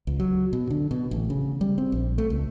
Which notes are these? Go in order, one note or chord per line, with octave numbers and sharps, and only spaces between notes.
C#2
F#3
B2
D3
B2
A1
C#3
G3
C4
A#1
A3
C#2